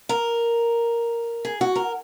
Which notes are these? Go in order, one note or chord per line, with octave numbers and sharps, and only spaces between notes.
A#4
G#4
F#4
A#4